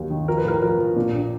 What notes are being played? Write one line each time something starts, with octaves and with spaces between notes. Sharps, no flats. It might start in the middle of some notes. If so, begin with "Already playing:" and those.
Already playing: D#2 F#3
D#3
F3 A#4
B4
A2 A#4
F3 A#4
F3
A#2
A#1